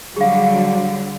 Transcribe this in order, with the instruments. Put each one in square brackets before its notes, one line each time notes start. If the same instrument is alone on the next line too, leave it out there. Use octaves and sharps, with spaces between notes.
[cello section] D3 F#3 G3 [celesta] G#4 F5